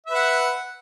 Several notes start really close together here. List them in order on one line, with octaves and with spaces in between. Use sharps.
E5 B4 F#5